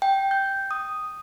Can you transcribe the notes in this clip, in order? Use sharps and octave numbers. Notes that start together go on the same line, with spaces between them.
G5
G6
D#6